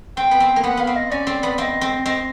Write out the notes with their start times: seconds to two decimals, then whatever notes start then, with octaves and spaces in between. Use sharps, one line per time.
0.17 C4 G5
0.31 B3
0.40 C4
0.56 A#3
0.63 B3 F#5
0.77 B3 F5
0.87 C4
0.96 D#5
1.11 C#4 D5
1.27 C4
1.43 B3
1.58 C4 D#5 F5
1.81 C4
2.05 C4 D#5